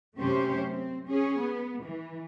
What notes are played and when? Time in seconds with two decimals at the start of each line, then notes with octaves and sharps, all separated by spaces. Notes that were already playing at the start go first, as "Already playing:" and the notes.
0.19 F#2 C3 A3 C#4 G4 C5
0.71 C4
1.07 C#4 G#4
1.41 B3
1.84 E3